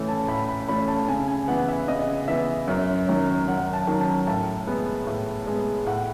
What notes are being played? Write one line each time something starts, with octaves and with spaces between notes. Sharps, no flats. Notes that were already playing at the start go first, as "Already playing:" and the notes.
Already playing: A2 E3 A3 C#4 C#5
A5
A2 B5
B5
E3 A3 C#4 B5
A5
C#3 G#5
G#5
E3 B3 F#5
E5
C#3 D#5
E3 B3 E5
F#2
D#3 F#3 C#4
F#2 F#5
A5
D#3 F#3 C#4
A5
A2 A5
G#3 B3
A2
G#3 B3
A2 F#5